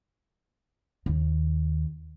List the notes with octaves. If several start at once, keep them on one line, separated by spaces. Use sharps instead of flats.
D#2